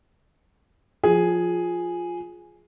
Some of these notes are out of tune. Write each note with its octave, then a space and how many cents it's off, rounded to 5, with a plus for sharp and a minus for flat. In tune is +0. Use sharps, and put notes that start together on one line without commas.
F3 +10 G#4 +0